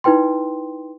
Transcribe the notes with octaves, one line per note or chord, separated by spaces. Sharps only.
D#4 E4 B4 G5 C6